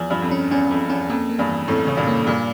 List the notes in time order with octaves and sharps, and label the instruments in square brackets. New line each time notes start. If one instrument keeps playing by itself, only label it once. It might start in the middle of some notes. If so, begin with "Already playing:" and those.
Already playing: [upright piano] E2 [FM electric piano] F3
[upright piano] G2 [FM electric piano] F3
[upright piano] F2
[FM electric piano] C#4
[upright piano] E2 [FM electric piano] C#4
[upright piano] F2 [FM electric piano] F3
[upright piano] E2 [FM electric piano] C#4
[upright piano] F2 [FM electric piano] A#3
[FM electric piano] A#3
[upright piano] E2 G2
[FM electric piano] E3
[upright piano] F2 A2 [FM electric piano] E3
[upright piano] C#3 [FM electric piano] E3
[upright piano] G2 A#2
[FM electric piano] A#3
[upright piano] G2 A#2 [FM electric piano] A#3